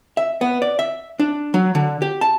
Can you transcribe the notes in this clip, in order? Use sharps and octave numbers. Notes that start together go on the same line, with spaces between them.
E5
B3
D5
E5
D4
F#3
D3
G4
A5